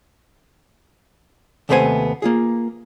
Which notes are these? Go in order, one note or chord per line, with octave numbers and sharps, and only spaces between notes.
D#2 C3 A3 B3 C5 G#5
A#3 F4 G#4